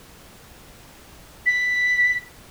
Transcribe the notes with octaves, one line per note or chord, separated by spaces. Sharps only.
B6